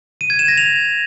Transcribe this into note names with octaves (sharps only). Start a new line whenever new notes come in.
D#7
G#6
E7
A#6
F7